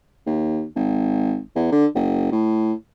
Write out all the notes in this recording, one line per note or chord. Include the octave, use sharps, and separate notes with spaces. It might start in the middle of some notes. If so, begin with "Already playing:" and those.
D#2
G#1
E2
D3
F#1
A2